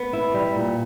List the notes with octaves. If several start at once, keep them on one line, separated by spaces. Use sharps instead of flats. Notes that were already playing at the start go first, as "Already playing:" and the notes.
Already playing: B3
E4
G3
A#2